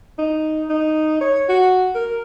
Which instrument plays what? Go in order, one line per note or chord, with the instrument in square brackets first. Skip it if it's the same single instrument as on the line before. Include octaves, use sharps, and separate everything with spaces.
[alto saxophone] D#4
D#4
C#5
F#4
A#4